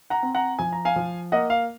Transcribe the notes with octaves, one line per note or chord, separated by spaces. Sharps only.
F#5 A#5
C4
F#5 A#5
F3 G#5
A#5
F5 G#5
F3
A#3 D#5 F#5
F5